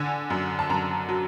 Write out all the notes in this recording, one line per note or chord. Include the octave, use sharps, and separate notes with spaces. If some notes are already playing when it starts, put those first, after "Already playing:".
Already playing: D3 G#5
F#2
A5
F#2 A#5
F#3